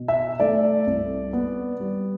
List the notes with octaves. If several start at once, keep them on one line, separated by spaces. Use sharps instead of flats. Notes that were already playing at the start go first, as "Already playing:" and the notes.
Already playing: B2
E5
A3 D5
C2
B3
G3